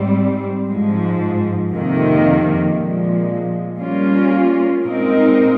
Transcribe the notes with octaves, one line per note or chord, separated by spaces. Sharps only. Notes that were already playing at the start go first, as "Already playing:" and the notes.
Already playing: G#2 G3 C4
G#2 F3 G#3
F2 C3 D#3 A#3
A#2 F3 G#3
G3 A#3 C#4 F4
A#2 G#3 C4 D#4 A#4